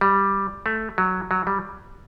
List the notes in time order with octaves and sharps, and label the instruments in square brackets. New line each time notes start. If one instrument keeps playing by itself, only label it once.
[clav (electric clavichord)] G3
A3
F#3
F#3
G3